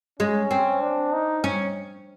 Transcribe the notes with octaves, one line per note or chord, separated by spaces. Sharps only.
G#3 C#4
C4
D4
D#4
C#4